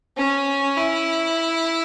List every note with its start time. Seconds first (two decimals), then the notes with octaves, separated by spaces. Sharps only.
0.17 C#4
0.77 E4